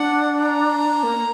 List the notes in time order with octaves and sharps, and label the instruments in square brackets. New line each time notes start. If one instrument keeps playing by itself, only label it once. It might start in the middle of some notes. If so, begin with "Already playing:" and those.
Already playing: [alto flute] D4 [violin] F#5
[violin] A#5
[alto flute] A#3